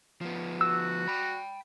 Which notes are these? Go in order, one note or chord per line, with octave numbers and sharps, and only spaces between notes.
F3 B3
F#4 E6
G5 B5